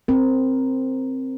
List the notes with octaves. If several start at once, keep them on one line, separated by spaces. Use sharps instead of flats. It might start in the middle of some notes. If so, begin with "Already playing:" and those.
C4 A#4